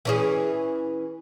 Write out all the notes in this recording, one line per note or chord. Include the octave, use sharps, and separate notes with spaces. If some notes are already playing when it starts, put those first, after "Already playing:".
E3 C#4 G#4